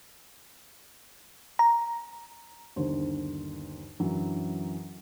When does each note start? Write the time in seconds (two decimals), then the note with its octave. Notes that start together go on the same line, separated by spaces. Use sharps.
1.59 A#5
2.76 G1 D#2 D3 C5
3.99 F#2 D3 E3 F#3